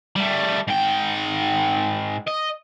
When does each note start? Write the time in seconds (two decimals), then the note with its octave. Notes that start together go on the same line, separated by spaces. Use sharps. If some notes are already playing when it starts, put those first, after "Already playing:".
0.16 G3 A3
0.68 G#2 G5
2.28 D#5